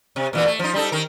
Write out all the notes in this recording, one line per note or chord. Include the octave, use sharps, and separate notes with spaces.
C3
A#2 E3 B3
A3
F3 D#4
G3 D#4 A4
D#3 A#4